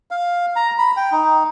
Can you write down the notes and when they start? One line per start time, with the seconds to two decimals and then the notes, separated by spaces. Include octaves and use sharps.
0.11 F5
0.56 A#5
0.78 B5
0.97 G5
1.12 D#4